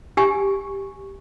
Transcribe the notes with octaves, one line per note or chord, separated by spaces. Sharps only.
G4 G#5 C#6